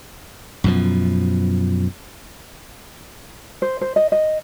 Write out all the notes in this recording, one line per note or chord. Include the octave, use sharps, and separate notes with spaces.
F#2 B2 F3
C5
C5
D#5
D#5